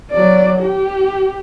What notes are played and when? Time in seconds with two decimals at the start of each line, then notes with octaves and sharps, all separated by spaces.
0.11 F#3 D5
0.60 G4